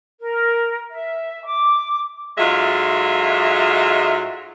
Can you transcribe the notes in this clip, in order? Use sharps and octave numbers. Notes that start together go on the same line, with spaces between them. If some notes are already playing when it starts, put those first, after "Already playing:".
A#4
E5
D6
G#2 F#3 G#3 A3 F4 E5